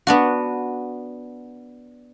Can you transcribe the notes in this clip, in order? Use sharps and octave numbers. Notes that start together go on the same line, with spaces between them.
B3 D4 F#4